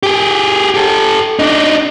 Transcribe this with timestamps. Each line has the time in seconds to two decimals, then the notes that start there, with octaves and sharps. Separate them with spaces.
0.03 G4 G#4
0.74 G4 A4
1.39 D4 D#4